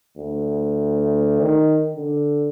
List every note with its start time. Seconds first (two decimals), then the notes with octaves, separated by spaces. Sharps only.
0.18 D2
1.42 D#3
1.96 D3